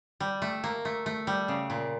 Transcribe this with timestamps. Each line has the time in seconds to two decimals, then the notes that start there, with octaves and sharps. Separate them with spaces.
0.20 G3
0.42 A3
0.64 A#3
0.85 A3
1.06 A3
1.27 G3
1.48 C#3
1.70 A#2